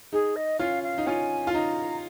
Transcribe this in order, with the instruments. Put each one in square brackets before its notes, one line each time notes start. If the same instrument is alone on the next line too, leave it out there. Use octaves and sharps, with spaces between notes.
[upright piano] D#4 [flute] G#4
[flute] D#5
[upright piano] C#4 F4 [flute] F5
[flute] F5
[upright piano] D#4
[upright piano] C#4 F4 [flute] G#5
[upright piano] F4
[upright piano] D#4 [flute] A#5